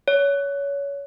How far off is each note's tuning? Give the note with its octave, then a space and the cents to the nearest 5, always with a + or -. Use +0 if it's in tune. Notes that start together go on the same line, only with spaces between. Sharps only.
C#5 +25